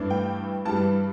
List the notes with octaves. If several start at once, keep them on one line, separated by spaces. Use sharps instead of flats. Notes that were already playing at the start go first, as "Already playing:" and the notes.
Already playing: G2 E3 A3 D4
G5
G2 E3 G3 A5